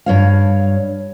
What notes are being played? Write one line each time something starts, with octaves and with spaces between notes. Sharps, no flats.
G2 C#5 F5